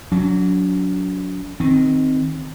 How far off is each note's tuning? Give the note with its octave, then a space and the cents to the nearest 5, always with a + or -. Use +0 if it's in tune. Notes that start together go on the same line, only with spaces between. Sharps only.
F#3 -10 D4 -45
D#3 +0 C4 +0